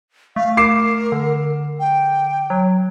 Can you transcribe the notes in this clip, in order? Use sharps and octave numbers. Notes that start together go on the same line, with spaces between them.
A3 F5
A#4 D6 C7 E7
D3
G5
F#3